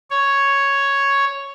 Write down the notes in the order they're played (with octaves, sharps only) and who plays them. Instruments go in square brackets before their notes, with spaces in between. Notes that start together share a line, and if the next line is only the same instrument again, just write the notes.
[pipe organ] C#5